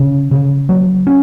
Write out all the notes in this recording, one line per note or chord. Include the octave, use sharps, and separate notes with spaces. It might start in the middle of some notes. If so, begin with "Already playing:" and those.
Already playing: C#3
C#3
F#3
C#4